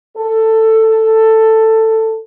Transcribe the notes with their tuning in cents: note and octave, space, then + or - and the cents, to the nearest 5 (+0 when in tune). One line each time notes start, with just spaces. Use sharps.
A4 +10